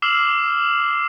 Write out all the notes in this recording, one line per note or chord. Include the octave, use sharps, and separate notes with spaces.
D6 E6 F6 C7 E7 F#7